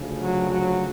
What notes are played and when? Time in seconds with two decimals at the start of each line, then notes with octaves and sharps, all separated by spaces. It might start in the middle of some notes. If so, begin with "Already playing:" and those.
Already playing: D2 C#3 F3
0.17 F#3
0.50 F#3